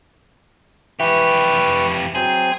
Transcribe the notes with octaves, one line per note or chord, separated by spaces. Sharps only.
F2 E3 G4 B4 C#6
F#3 C4 G#4 C5